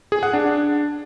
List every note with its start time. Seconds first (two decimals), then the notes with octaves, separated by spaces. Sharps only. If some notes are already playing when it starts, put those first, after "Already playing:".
0.12 G#4
0.23 F#5
0.33 D4